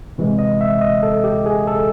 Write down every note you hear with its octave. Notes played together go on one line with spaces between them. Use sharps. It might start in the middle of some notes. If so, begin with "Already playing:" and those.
C3 E3 G#3
D#5
E5
D#5
A4
G4
G#4
A4